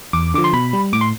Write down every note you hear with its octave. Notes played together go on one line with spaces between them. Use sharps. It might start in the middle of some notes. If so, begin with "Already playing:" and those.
E2 D6
D3 F3 D6
C6
B2 B5
G3
A2 D6
C6